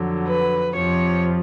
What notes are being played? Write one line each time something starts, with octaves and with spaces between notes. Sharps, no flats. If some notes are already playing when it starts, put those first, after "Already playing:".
Already playing: F2 D3 F#3
B4
F2 C3 F3 C#5